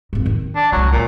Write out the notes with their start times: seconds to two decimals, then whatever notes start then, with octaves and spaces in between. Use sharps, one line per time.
0.13 F2 G#2
0.26 D#3 E3
0.56 D4
0.72 C2 F#3 G#3
0.92 A#1 A#2